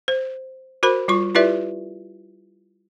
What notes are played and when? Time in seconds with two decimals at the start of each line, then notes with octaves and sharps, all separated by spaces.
0.08 C5
0.83 F#4 A#4 C5 B5
1.08 G3 F4 C#6
1.35 E4 F4 G4 B4 D5 E5